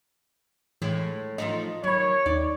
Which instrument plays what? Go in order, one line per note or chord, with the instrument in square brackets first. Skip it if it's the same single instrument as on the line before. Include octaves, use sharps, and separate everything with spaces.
[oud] A2 G#3 E4 [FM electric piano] E3
[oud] F3 A3 D#4 [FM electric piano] D#5
[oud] D#3 [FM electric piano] F#3 B5 [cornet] C#5
[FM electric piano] D#2 D#4 C#6 [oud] D5